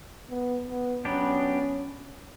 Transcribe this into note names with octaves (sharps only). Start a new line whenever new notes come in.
B3
B3
F#3 B3 C#4 D4 G4